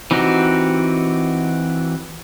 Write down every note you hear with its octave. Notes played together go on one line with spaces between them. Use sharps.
E3 C4 D#4 F#4 G4